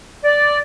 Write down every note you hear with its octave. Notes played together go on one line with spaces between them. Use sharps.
D5